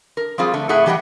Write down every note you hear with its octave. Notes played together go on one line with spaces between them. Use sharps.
A#4
F3 G3 C4 F4 G#4
D3 A3
A2 G#4 A4 E5 F#5
E3 G3 G4 D5 D#5 F#5